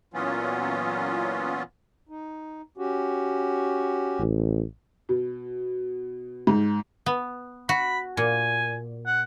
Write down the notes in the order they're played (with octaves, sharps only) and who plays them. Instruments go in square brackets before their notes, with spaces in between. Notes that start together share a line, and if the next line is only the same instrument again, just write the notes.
[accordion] A#2 E3 F#3 B3 C#4 F4
[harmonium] D#4
C#4 F#4 G4
[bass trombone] A1
[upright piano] B2
G#2
[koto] B3
[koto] F#4 [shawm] B5
[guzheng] A#2 [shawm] G#5
[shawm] F#5